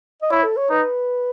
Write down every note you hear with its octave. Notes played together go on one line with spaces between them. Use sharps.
D#5
E4 C#5
A4
C#5
D#4 B4